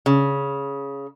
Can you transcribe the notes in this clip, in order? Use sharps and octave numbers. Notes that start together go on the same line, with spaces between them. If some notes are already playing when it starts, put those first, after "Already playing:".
C#3